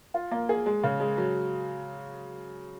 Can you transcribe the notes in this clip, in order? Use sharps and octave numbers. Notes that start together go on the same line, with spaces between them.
F4
A#3
G#4
G#3
C#3
G#3
F#3